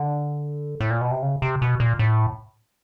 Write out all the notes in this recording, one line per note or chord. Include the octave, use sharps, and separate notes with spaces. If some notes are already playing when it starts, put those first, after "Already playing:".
Already playing: D3
A2
A#2
B2
C3
C#3
C3
B2
A#2
A2